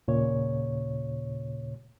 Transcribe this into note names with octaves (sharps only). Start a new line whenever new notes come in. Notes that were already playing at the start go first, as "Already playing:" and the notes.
D#2 A#2 C#3 C#5